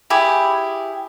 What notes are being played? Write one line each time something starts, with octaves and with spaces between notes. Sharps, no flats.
E4 G4 G#4